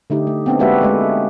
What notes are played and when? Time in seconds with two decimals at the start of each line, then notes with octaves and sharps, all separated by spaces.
0.10 D3 A3 D#4 G4
0.27 A3
0.46 B3 C4 D4
0.59 G#3 A#3 F#4 G4 B4 E5
0.82 G#3 A3